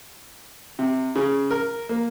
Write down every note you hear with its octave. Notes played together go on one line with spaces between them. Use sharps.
C3
C#3
A#4
A#3